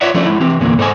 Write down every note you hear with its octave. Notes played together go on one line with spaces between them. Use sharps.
F4 B4 C#5 D5 E5 F#5
F3 A3 C#4 D4
G#3 E4
E3 C4 G4
E2 A#2 D3 A#3 B3
G#2 A4 C5 D#5 G#5